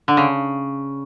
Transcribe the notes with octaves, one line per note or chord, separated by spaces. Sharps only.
D3
C#3